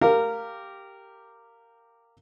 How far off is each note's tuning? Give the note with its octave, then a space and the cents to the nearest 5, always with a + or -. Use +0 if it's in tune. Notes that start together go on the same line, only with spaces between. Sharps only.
G4 +0 A#4 -15 F5 +0